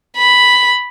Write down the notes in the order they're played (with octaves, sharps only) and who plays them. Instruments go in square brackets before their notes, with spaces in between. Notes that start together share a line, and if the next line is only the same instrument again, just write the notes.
[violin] B5